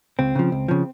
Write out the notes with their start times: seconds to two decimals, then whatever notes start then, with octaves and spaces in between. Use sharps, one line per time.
0.19 C#2 C4
0.35 C#3 F3
0.52 C#2
0.68 C#3 F3